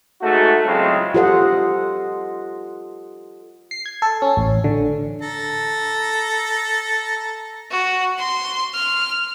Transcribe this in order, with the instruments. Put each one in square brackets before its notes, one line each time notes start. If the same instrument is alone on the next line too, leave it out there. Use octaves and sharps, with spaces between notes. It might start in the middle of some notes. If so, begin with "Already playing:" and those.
[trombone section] G#2 A3 F#4
A2 C#3 F#3 G#3 C4 F4
[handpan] F4 G4 A4 C5 D#5 F#5
[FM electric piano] C7
G#6
A4
C#4
A1
D3
[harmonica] A4 A#5
[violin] F#4
C6
F6